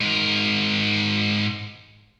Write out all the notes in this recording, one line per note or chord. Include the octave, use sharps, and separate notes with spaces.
G#2 A#4